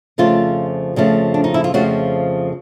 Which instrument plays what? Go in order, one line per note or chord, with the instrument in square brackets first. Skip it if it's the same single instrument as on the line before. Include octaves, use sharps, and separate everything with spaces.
[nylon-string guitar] F2 C#3 F3 A3 F4
F2 C#3 F3 A3
D4
D#4
E4
F4
F2 C#3 F3 A3 F#4